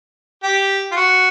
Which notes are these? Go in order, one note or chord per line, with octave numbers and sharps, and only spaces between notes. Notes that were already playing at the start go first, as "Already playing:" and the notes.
G4
F4
F#4